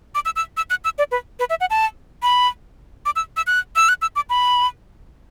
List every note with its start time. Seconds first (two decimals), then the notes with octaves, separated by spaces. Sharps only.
0.15 D6
0.25 E6
0.36 E6
0.57 E6
0.70 F#6
0.84 E6
0.98 D5
1.12 B4
1.39 B4
1.50 E5
1.61 F#5
1.70 A5
2.22 B5
3.06 D6
3.16 E6
3.37 E6
3.47 F#6
3.76 E6
3.89 F#6
4.02 E6
4.16 D6
4.30 B5